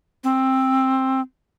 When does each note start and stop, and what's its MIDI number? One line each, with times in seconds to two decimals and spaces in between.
0.24 1.21 60